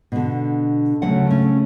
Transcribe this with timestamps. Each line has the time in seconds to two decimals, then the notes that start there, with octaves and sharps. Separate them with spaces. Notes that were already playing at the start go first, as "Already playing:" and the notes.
0.12 B2 D3
1.02 D2 C#3 F#3 A3 F#5
1.31 C#4